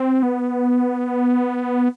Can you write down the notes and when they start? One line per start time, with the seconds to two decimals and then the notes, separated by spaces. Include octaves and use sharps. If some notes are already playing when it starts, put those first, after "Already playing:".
Already playing: C4
0.23 B3